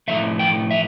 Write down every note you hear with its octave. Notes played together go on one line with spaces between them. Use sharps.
A2 F3 A3 E5
G5
E5